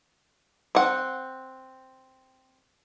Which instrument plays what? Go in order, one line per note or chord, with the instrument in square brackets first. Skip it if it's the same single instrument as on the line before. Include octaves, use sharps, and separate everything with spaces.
[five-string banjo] C4 F#5